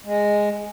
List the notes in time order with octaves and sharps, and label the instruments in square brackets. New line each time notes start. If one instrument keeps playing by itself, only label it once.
[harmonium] G#3